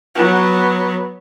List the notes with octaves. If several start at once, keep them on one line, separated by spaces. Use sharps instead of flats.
F#3 B3